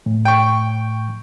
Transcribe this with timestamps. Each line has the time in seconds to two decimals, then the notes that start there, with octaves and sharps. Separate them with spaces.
0.06 A2
0.25 G5 C#6